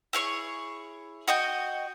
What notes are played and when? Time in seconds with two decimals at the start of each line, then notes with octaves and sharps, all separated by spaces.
0.13 E4 G#4 C#5 C#6
1.28 F#4 D#5 G5